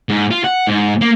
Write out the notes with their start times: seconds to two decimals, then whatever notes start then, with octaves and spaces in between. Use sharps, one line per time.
0.09 G#2
0.31 F4
0.44 F#5
0.67 G#2
1.01 A#3